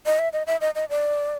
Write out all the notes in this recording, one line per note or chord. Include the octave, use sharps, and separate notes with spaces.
D#5
E5
D#5
E5
D#5
D#5
D5